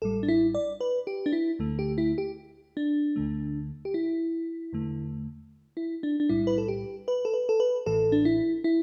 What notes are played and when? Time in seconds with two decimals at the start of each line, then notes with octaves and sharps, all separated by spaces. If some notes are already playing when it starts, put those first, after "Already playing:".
0.02 A1 A2 G3 A4
0.23 D4
0.28 E4
0.55 D5
0.81 B4
1.07 G4
1.26 D4
1.32 E4
1.59 D2 D3 A3
1.79 G4
1.98 E4
2.18 G4
2.77 D4
3.16 D2 D3 A3
3.85 G4
3.94 E4
4.73 E2 D3 A3
5.77 E4
6.03 D4
6.20 D4
6.29 B1 A2 G3 E4
6.47 B4
6.58 A4
6.68 G4
7.08 B4
7.25 A4
7.34 B4
7.49 A4
7.60 B4
7.86 A1 A2 E3 A4
8.12 D4
8.25 E4
8.64 E4